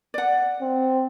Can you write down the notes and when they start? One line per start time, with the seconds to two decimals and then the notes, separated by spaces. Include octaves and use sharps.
0.14 D5 F#5
0.61 C4